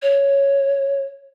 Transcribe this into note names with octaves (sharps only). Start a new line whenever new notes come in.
C#5